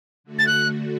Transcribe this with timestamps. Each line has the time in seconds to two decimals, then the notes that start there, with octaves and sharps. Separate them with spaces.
0.24 D3 A3 F#4
0.39 A6
0.47 F#6